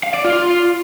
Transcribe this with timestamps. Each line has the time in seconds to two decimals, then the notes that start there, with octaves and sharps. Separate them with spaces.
0.03 F5
0.14 D5
0.25 F4